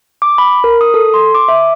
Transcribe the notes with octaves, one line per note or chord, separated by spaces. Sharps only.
D6
B5
A#4
D#6
A4
C6
D6
E5